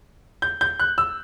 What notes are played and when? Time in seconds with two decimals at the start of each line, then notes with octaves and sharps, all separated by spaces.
0.42 G6
0.61 G6
0.80 F#6
0.98 E6